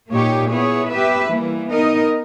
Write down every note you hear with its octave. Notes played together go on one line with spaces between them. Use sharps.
A#2 A#3 D#4 G4 C#5
B3 E4 G#4 C#5
B3 G4 B4 E5
E3 G3 A#3
B3 D#4 A#4 D#5